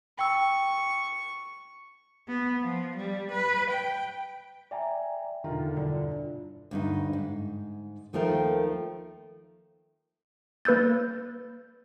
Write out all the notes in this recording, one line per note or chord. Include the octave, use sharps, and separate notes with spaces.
G5 C#6 E6
B3
F3
G3
B4
G5
D5 E5 G5 G#5 A#5
E2 B2 D3 D#3 F4 A#5
G1 E4 F4 D5
D2 G2 D#4
G#2
D#2 D#3 F3 A3 A#4 G5
A#3 B4 E6 G6 A6